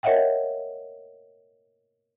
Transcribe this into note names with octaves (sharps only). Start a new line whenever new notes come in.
A#4 C#5 D#5 E5 F#5 G5